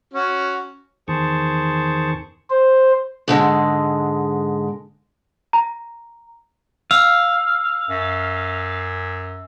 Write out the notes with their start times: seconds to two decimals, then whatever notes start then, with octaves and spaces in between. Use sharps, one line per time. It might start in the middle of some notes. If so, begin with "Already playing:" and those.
0.13 C#4 F#4
1.08 E2 D#3 G#4 C5 A5 C#6
2.50 C5
3.28 G#2 D3 G#3
5.53 A#5
6.91 F5 E6
7.89 F#2